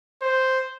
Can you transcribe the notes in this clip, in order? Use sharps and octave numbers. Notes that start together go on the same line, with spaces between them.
C5